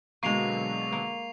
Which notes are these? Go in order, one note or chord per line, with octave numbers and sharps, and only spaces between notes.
B2 D3 F#3 G#3 A#3 C#6 C7 F7
A#3